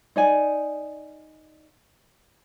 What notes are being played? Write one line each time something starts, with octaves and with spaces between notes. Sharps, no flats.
D#4 D5 G#5